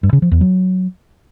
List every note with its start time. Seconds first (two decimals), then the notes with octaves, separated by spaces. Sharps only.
0.03 G2
0.13 C#3
0.22 F3
0.32 E2
0.41 F#3